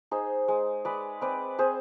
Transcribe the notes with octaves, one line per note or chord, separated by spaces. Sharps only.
D#4 G#4 C5
G#3
G#3 B4 D5
C4 B4 D5
C4 G#4 C5